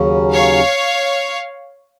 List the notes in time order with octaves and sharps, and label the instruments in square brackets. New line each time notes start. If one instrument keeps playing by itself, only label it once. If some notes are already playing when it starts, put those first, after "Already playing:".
Already playing: [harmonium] D#2 C#3 F#3 C#4
[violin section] C#5 F5